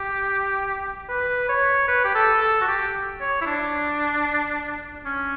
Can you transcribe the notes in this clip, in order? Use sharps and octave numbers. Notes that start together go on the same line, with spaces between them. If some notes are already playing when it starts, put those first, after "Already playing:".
Already playing: G4
B4
C#5
B4
G4
A4
A4
F#4
G4
C#5
E4
D4
C#4